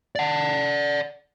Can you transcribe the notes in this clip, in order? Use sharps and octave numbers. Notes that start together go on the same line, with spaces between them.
D5 F#5